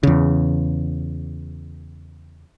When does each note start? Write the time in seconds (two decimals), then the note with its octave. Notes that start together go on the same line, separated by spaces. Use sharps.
0.03 E2 C#3